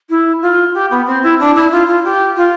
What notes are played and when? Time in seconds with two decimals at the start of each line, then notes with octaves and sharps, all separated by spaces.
0.10 E4
0.42 F4
0.74 G4
0.91 B3
1.07 C4
1.23 E4
1.40 D4
1.55 E4
1.72 F4
1.88 F4
2.04 G4
2.37 F4